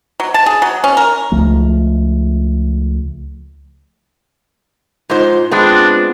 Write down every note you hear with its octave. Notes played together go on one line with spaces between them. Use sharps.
F#3
A5
G#4
F#3
C#4
A#4
C#2 F3 A3
G#2 D#4 F4 C5
G#3 B3 C4 D4 F4